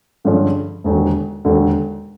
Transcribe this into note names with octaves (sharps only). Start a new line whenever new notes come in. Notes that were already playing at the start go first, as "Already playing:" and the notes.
G2 D3 F3 G#3 C#4
E1 D#2 D3
E1 D#2 D3